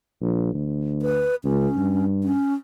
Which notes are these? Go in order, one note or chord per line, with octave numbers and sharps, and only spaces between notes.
A#1
D2
B4
C#2 C#4
G2
C#4